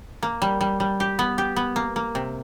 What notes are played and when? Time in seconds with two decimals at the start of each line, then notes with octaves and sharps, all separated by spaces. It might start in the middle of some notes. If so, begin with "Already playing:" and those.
0.23 A#3
0.42 G3
0.61 G3
0.80 G3
1.00 G4
1.19 B3
1.38 G4
1.56 B3
1.76 A#3
1.96 A#3
2.15 C3